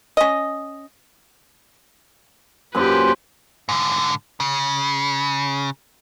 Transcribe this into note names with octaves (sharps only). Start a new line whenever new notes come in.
C#4 D#5
F#2 A#2 G4 B4 C5
G#2 D3
C#3